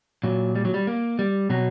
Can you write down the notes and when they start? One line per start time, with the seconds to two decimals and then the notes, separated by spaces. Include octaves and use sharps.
0.23 A#2 F#3
0.55 G3
0.65 F#3
0.74 G3
0.87 A#3
1.19 G3
1.50 B2 F#3